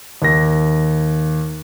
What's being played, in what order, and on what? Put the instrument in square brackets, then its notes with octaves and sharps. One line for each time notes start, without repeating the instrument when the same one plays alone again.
[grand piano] D#2 A#6